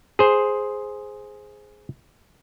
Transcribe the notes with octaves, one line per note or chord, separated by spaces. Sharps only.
G#4 C5